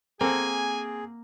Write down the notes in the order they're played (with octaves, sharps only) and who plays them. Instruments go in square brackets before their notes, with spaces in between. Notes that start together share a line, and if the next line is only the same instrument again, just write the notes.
[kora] A#3 F#5 [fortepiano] C4 A4 [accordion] G#4 [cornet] G#5